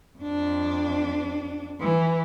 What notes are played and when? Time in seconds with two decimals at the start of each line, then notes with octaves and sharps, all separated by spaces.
0.19 F2 D4
1.81 E3